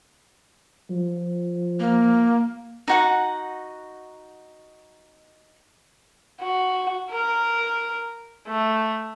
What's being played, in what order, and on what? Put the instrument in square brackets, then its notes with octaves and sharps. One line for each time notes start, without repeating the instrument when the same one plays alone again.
[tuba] F3
[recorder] A#3
[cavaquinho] D#4 F#4 F#5
[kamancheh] F#4
A#4
A3